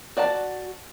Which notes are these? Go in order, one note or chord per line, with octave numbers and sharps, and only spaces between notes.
F#4 D5 F#5 A5